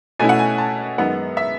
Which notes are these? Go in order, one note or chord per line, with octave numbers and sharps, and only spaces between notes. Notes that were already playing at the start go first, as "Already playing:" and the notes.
B2 A3 C#4 E4 G#5
F#5
G#5
A5
F#2 D#3 G#3 B3 F#5
E5